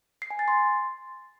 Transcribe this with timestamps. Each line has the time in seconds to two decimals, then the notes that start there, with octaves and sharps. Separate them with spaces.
0.22 C7
0.30 G#5
0.39 A6
0.48 C6